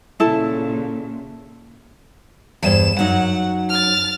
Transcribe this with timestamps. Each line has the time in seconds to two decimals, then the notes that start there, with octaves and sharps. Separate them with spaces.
0.20 A#2 C#3 E4 A4 A5
2.63 E2 G2 C5 E7
2.99 F#2 F#3 D#4 F#5
3.69 F6 A6